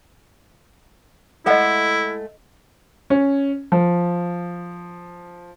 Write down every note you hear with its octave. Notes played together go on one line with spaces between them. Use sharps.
G#3 A3 E4 A4 D#5 F#5
C#4
F3